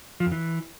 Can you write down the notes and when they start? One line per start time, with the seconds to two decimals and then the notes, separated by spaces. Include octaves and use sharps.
0.20 F3
0.26 F2
0.32 E3